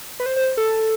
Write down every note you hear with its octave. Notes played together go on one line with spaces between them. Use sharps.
B4
C5
C5
A4